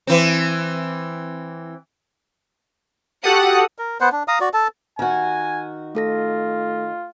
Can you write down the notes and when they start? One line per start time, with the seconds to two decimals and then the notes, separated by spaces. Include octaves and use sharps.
0.07 E3 C4
3.24 F#4 G4 A4 F#5 D#6
3.78 A#4
4.01 B3 C5 F#5
4.12 D4
4.28 F5 A#5 D#6
4.41 F#4 D5
4.54 A4 A5
4.99 D#3 F#4 G#5
5.95 A3 F4 A4 A#6